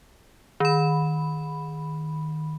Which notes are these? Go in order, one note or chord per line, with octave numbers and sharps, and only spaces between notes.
D#3 B5